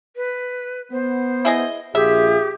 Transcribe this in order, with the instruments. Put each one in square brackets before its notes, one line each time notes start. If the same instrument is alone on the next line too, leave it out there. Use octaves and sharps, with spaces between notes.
[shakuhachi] B4
[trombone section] B3 [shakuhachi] C5
[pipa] E4 G#4 D#5
[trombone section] A#1 F4 [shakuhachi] G4 [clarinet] G#4 [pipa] E5